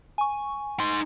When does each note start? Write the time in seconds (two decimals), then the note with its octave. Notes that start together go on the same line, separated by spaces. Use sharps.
0.18 G#5 C#6
0.80 D#4 C6